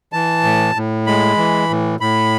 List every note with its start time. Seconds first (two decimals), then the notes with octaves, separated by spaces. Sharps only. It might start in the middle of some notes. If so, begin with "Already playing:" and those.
0.13 E3 A5
0.44 A2
0.75 A2
1.07 G#3 B5
1.38 E3
1.69 A2
2.00 A2 B5